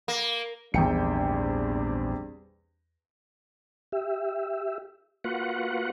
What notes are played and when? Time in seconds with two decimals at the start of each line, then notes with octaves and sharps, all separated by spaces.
0.08 A#3
0.74 A#1 E2 G#2 G3 C4 D4 G5 C#7
3.92 G4 E5
5.24 A#3 F4 F#4 B4 F#5